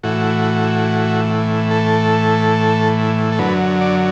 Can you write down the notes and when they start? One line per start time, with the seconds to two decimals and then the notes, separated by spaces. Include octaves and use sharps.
0.03 A2 E3 F#4
1.71 A4
3.32 A4
3.39 F#2 D3 F#3 B4
3.81 D5